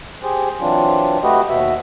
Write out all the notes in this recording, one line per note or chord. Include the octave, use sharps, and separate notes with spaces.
G4 G#4 C5
E3 F#3 C4 D4 F4
A3 F#4 G4 B4 D#5
D#2 B2 F#4 E5